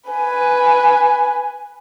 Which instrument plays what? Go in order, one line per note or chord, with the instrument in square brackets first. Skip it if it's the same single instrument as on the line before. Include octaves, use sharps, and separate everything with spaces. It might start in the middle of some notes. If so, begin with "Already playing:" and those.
[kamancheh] B4 G#5